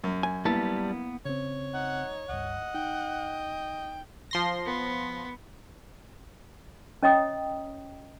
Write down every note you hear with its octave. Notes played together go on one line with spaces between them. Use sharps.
F#2
G#5
G3 A#3 B3 E4 A5
C#3 C4 C#5
D#4 F#5
C#2 G2 D#5 F#5
D#4 G5
F3 C6 A#6
B3
C#4 C#5 D#5 G5 A#5 D#6